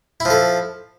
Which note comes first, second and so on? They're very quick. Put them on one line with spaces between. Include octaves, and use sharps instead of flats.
E4 F3 A4